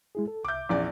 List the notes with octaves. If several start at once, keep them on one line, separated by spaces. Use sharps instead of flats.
G#3 E4 G#4
A4
C2 E5 D6 G6
A#1 E2 C#4 D5